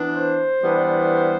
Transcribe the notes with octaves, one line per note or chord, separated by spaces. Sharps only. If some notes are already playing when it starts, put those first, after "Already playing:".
Already playing: E3 B3 D4
C5
E3 G3 B3 D4